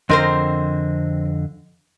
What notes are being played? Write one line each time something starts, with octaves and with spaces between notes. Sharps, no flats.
F2 D3 C4 A#4 C5 D#5